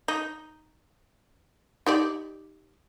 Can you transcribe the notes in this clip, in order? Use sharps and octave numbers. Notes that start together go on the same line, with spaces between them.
D#4
D#4 G4 D5